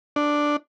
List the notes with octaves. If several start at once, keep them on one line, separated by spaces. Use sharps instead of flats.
D4